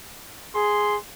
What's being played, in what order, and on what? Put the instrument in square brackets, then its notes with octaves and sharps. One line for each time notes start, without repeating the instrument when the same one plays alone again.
[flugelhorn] G#4 [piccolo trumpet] C6